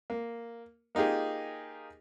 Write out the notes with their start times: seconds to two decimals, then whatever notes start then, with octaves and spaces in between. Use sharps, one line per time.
0.10 A#3
0.95 A#3 D#4 F4 G4 G#4